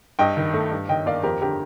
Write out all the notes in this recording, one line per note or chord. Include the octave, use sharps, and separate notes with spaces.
G2 D#5 G5
D#3
A3
G2
D#3 D#5 G5
A#3 D5 F5
F2 G4 A#4
D3 G4 A#4